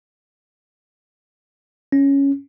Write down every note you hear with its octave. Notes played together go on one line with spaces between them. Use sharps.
C#4